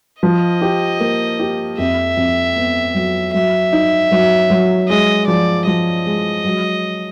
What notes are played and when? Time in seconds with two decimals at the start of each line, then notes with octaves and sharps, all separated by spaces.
0.23 F3 D#5
0.62 G4
1.00 A#3
1.39 G4
1.78 F2 E5
2.17 F2
2.56 B3
2.95 F#3
3.34 F#3 E5
3.72 D#4
4.12 F#3
4.50 F#3
4.89 G#3 D#5
5.27 F3 D5
5.67 F3 D#5
6.06 G#3
6.45 F#3